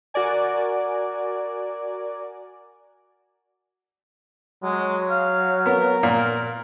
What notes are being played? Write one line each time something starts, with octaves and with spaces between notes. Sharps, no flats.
F#4 A#4 D5 G#5
F#3 G#3
F5
B3 A#4
A#2